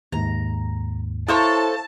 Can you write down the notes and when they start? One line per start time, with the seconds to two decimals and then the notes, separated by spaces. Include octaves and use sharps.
0.12 D#2 G#2 A#5
1.28 E4 A4 C5 C#5 E5 F5 A5